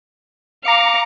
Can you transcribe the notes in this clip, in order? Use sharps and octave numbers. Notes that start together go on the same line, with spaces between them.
F5 A#5 D6 C#7